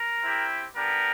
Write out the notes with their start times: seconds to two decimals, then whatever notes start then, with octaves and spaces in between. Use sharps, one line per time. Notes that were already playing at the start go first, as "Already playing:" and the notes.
Already playing: A#4
0.22 C4 E4 G4
0.76 B3 D4 G4 A#4